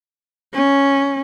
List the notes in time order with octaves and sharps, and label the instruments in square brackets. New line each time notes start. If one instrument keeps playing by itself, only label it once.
[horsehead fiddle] C#4